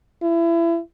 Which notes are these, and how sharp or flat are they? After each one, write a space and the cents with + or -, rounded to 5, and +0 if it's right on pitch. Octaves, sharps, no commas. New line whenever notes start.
E4 +30